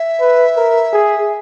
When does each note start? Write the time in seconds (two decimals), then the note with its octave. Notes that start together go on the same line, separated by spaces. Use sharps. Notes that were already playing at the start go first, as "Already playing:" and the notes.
Already playing: E5
0.21 B4
0.56 A#4
0.93 G#4